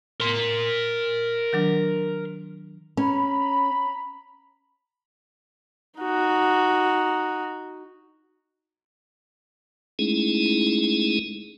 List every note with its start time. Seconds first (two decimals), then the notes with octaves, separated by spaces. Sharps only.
0.20 A#4 C6
1.53 D#3 F#3 D4
2.97 C#4 A#5 B5
5.99 D#4 F#4
9.99 G#3 A3 C#4 D#4 E4 G#4